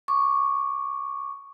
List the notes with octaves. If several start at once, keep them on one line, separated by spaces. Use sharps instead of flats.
C#6 D6